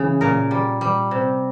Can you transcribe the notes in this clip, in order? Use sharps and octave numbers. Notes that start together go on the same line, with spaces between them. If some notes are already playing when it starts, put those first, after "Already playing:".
Already playing: C#3 E3
A#2 A#4
G3
G3
C3